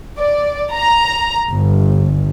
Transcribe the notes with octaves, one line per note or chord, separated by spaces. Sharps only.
D5
A#5
G1